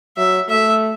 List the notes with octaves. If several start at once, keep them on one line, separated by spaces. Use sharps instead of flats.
F#3 E5
A3 E5